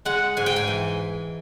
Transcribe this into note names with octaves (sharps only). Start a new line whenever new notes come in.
G#3 F#5
G#2 G#5
G5
G#5
E3